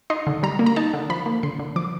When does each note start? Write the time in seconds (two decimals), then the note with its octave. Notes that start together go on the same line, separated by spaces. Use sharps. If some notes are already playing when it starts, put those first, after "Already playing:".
0.10 D#4 C6
0.27 D3
0.43 G3 A#5
0.59 A#3
0.66 A#5
0.76 D#4 A5
0.94 D3
1.10 F3 B5
1.26 A#3
1.43 D3 C6
1.59 D3
1.76 F3 D6